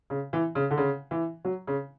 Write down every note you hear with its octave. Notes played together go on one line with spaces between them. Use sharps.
C#3
E3
C#3
D3
C#3
E3
F#3
C#3